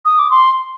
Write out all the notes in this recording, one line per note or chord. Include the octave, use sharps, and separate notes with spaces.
D#6
D6
C6